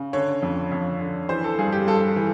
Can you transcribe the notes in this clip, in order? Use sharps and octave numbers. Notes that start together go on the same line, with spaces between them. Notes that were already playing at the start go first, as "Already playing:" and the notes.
Already playing: C#3
D3 C#5
F2
F2
D3
E3 C5
A4
G2 G#4
G4
G2 A4
E3